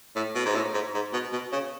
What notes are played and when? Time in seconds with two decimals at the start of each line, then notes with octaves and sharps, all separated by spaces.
0.16 A2
0.35 B2
0.45 G#2
0.55 A2
0.74 G#2
0.94 G#2
1.13 B2
1.32 B2
1.52 C#3